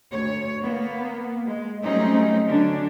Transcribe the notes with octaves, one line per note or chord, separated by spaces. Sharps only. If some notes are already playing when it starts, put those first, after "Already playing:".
D2 C#5
A#3 B3
G#3
F#3 G3 A3 C4 C#4 D#4
D3 F#3 C#4 D4